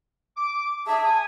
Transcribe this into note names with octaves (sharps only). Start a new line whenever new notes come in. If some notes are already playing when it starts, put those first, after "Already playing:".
D6
G#4 E5 A5
G#5 D#6